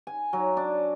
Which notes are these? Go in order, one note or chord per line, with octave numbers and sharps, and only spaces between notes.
G#5
F#3
D4